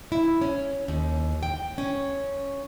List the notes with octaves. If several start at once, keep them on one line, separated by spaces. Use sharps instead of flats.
E4
C#4
D#2
G5
C#4